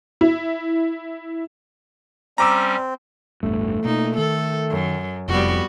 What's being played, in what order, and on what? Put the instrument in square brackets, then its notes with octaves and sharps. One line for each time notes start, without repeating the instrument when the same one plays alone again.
[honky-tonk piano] E4
[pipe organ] G3 C#4 [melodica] C4 [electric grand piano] A#5 D6 E6
[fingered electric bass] A1 E2 G2 [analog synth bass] A3
[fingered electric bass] B2 A#3 [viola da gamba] D#4
[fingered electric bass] D#3 [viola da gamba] A4
[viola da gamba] F#2
[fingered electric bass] F1 [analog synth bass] F2 [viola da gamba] G3 B3 F#4